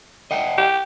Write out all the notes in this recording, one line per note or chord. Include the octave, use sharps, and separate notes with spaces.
D#5 F#5 G5
G4